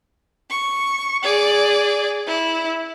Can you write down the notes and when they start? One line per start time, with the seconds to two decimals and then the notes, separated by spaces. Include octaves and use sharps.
0.50 C#6
1.23 G#4 D5
2.27 E4